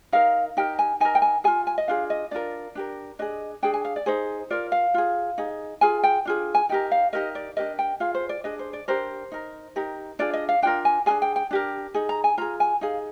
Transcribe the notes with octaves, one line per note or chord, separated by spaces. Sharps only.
D#4 A#4 F5
D#4 G4 A#4 G5
G#5
D#4 A#4 G#5
G5
G#5
F4 G#4 G#5
G#5
D#5
D4 F4 G#4 F5
D#5
D4 F4 A#4 D5
D4 G4 A#4
D4 G#4 D#5
D4 G#4 G5
G#5
F5
D5
D#4 G#4 C5
F4 A#4 D5
F5
F4 G#4
D#4 G#4
F4 G#4 G#5
G5
D4 F4 G#4
G#5
D#4 G4 A#4 G5
F5
D#4 G4 A#4 D#5
D5
D4 G4 A#4 D#5
G5
F4 G#4 F5
C5
D5
D4 G#4 D#5
C5
D5
D4 G4 A#4 C5
D#4 A#4
D#4 G4 A#4
D4 F4 G#4 D5
D#5
F5
D4 F4 A#4 G5
G#5
D4 F4 G#4 G#5
G5
G5
D4 G4 A#4
D#4 G#4
A#5
G#5
F4 G#4 A#5
G#5
D#4 G#4 F5